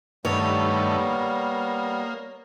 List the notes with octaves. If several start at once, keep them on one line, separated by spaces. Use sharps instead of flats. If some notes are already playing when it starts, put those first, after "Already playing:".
G2 D#3 G3 A3 B3 C#5
A#3